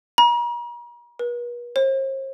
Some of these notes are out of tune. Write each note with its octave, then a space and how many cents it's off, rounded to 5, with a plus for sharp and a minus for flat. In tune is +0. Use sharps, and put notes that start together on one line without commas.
A#5 +40
B4 -45
C5 +45